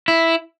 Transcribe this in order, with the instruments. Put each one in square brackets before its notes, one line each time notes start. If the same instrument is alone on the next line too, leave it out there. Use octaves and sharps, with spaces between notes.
[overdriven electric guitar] E4